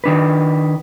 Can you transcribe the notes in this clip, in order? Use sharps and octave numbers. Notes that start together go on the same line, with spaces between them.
D#3 D4 B4